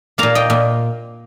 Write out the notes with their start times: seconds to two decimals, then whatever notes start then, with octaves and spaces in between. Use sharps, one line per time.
0.18 A#2 A#3 F5 A#5
0.35 D#5 G5
0.50 A#2